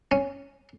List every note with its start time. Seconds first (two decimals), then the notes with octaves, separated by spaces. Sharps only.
0.11 C#4